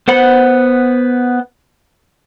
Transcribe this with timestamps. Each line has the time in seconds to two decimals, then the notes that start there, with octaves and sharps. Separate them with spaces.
0.08 B3 C5 F#5 B5